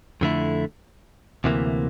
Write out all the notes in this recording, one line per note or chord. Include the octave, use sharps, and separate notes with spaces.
F2 D3 A3 E4
D2 C3 E3 A#3